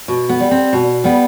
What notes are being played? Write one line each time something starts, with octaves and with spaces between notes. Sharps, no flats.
B2
B3
G3
C4
B2
G3 B3